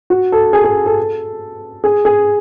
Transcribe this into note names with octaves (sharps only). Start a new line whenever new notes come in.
F#4
A4
G#4
G#4
A4
G#4
G#4